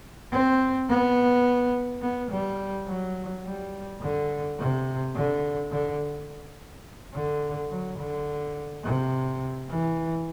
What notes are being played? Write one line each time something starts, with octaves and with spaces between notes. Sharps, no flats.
C4
B3
B3
G3
F#3
G3
D3
C3
D3
D3
D3
F#3
D3
C3
E3